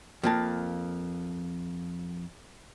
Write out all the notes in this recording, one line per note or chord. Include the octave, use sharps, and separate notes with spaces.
F2 A#3 A5